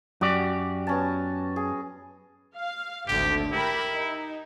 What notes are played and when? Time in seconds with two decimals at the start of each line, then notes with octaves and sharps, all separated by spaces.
0.21 F#2 F#4 G4 D5
0.87 B3 C#4 A5
1.56 G#4
2.56 F5
3.08 G#1 D2 D3 G4
3.53 E4 G4 A#4 B5
3.92 D#4